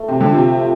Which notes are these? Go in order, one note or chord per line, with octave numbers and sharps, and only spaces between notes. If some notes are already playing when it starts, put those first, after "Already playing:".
Already playing: A3
C3 C4
D3 F3
C3 A3
F3